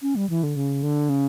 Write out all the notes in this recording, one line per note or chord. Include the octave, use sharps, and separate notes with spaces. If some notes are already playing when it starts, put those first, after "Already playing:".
C#4
G3
E3
D3
C#3
D3
C#3